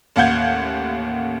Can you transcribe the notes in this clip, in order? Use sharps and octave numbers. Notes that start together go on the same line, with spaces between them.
A1 D#2 F5 F#5 G6 G#6